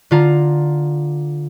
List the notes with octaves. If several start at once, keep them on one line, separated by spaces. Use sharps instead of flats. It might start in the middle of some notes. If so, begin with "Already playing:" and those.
D3 F4 A#5